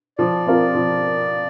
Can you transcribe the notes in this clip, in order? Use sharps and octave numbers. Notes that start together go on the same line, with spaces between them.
F3 D5
C4 F4 A#4
F3